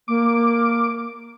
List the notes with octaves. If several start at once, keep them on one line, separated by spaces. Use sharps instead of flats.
A#3 D6